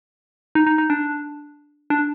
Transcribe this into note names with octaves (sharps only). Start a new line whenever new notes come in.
D#4
D#4
D#4
D4
D4